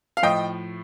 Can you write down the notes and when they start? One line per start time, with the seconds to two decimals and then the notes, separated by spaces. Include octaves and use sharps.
0.17 F5
0.23 A2 F3 D#5 G5